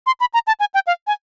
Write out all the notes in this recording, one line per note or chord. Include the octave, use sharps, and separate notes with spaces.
C6
B5
A#5
A5
G#5
G5
F5
G#5